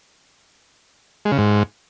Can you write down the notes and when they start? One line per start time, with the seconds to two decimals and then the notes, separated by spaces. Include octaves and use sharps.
1.25 G#3
1.32 C#3
1.38 G#2